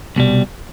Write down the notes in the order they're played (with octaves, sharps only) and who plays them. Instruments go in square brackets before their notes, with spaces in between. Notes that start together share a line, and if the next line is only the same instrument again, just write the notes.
[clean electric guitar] C2 B2 G3